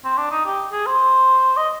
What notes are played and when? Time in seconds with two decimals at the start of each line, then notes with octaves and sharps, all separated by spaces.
0.05 C4
0.18 D4
0.31 D#4
0.46 G4
0.72 G#4
0.87 C5
1.57 D#5